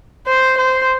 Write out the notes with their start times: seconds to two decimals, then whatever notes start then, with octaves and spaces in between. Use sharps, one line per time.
0.26 C5
0.57 C5